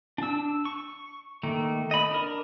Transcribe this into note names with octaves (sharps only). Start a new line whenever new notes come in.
D4 E6
C#6
D#3 A3 A#3
D#5 B5
D4 A#4